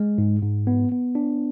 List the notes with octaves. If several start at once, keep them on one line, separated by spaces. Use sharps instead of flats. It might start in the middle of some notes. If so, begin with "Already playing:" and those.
Already playing: G#3
G#2
G#2
B3
B3
D4